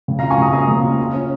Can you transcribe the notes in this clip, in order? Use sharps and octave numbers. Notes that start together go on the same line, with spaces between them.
C#3
F5 A#5
F4
G#5 C#6
C#3 A#5 D#6
A#3 A#5 D#6
C#3
F4
F4
C#4